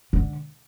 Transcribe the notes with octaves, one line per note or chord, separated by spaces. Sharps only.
D3